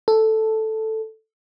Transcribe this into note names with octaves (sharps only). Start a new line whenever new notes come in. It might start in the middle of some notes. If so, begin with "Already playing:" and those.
A4